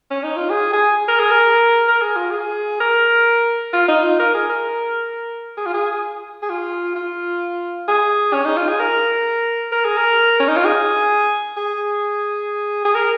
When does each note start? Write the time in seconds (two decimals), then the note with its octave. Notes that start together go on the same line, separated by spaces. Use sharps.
0.11 C#4
0.24 D#4
0.37 F4
0.50 G#4
0.73 G#4
1.08 A#4
1.20 G#4
1.31 A#4
1.88 A#4
2.02 G#4
2.16 F4
2.30 G#4
2.80 A#4
3.73 F4
3.88 D#4
4.04 F4
4.19 A#4
4.34 G#4
4.49 A#4
5.57 G#4
5.66 F4
5.74 G#4
6.42 G#4
6.50 F4
6.96 F4
7.88 G#4
8.33 C#4
8.45 D#4
8.57 F4
8.68 G#4
8.80 A#4
9.72 A#4
9.85 G#4
9.97 A#4
10.39 C#4
10.48 D#4
10.57 F4
10.65 G#4
11.57 G#4
12.85 G#4
12.95 A#4